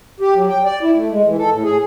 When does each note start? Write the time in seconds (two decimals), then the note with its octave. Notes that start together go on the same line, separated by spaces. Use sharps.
0.20 G4
0.35 F#3
0.49 G5
0.64 D5
0.82 E4
0.95 A3
1.11 G#3
1.26 E3
1.38 A4
1.50 A2
1.63 G#4